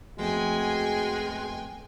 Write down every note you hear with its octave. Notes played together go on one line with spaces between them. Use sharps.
F2 G#3 A3 B3 F#4 G5 G#5